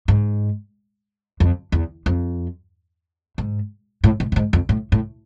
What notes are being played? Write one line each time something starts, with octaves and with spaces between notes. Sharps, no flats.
G#2
F2
E2
F2
G#2
A2
G#2
A2
G#2
F2
A2
A2